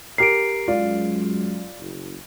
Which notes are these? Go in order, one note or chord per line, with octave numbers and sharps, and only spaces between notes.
G4 A#4 C7 D7
F#2 F#3 G#3 F4 D5
F#1